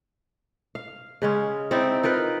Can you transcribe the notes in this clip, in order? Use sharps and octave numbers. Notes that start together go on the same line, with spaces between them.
F5
C#3 G#3 C#4
C4 D#4 E4 D5
D#4 F4 A#4 B4